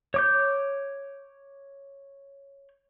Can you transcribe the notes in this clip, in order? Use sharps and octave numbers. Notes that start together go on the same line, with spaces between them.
C#5 D6 G6